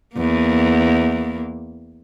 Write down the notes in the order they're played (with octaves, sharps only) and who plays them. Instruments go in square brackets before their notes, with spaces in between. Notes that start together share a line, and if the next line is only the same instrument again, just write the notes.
[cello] E2 A#3